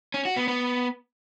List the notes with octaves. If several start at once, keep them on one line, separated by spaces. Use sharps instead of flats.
C#4
F#4
B3
B3